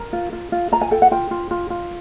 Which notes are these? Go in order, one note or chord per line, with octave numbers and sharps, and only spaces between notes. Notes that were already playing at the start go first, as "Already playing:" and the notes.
Already playing: A#4 A#5
F4
F4
F4
F4 A#5
G#5
A4 G5
F#5
F4 G5
F4
F4
F4